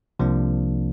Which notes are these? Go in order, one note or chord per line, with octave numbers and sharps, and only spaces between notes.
C2 C3 F3 A#3 D4